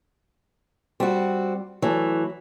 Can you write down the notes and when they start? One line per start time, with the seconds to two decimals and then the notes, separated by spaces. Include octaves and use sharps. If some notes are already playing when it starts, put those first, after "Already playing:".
1.00 G3 C4 F#4
1.82 E3 F#3 A3